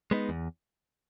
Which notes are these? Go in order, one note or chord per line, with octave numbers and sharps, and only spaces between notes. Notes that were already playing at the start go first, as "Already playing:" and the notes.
G#3 B3 D#4
E2